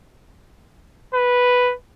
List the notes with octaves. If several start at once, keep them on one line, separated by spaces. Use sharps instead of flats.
B4